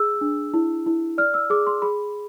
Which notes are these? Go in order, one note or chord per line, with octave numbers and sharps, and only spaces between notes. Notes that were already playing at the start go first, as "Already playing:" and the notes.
Already playing: G#4 E6
D4
E4
E4
D5 F6
E6
G#4 D6
C6
G#4 B5